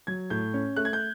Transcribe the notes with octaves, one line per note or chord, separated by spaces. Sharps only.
F#3 G#6
A2 G6
C#4
A3 F#6
G#6
G6